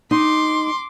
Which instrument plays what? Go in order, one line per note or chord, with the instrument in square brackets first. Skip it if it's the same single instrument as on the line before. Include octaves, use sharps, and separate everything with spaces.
[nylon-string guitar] D#4 [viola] C6 D6